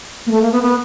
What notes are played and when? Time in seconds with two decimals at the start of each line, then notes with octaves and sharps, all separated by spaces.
0.27 A#3
0.31 A3
0.42 A#3
0.52 B3
0.63 B3